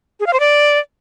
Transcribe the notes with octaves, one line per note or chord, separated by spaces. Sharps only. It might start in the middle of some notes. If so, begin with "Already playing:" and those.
G#4
F5
C5
D5